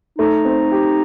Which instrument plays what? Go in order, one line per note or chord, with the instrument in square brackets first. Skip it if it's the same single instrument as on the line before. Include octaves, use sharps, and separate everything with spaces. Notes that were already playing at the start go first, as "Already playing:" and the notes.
[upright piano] A3 [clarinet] D#4
[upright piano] C4
G4